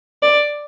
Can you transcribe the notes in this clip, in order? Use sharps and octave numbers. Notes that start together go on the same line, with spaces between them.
D5